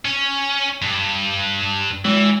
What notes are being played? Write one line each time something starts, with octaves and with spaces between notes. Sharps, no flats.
C#4
G2
E3 G#3